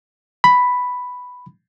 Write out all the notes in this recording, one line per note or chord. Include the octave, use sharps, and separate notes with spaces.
B5